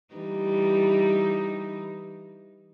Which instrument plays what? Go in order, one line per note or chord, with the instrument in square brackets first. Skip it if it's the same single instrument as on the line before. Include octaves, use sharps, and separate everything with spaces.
[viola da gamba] E3 G3 D#4